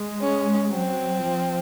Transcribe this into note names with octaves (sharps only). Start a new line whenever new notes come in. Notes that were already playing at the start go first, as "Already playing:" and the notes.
Already playing: G#3
C#4
F#3 C4
F3